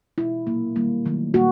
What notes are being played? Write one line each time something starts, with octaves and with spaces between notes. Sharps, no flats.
B2 G#3 E4
A#2 F#3 A#3
D#3 G3 A#3
D#3 F#3 A3
A#2 G3 A#3 F#4